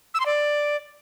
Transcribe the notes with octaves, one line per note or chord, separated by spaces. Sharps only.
E6
C6
D5